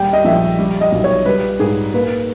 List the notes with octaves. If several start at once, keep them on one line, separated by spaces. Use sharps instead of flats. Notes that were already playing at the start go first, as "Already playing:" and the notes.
Already playing: D#2 G3 G5
D#5
A#1 E5
G3
D#5
B1
C#5
G3 B4
G#2 G#4
A#3 B4